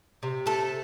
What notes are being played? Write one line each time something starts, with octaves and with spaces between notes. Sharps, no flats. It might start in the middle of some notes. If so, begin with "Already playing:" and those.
C3
A3 A4